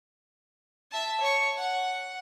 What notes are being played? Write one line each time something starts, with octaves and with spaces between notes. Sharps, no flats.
E5 A5
C#5 C#6
F#5